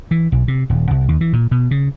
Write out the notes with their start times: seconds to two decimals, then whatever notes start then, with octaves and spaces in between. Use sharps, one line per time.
0.11 E3
0.32 B1
0.48 C3
0.70 D#1
0.91 C2
1.08 D#2
1.21 E3
1.33 A#2
1.51 B2
1.71 C#3